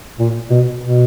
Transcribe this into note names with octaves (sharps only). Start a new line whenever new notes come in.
A#2
B2
B2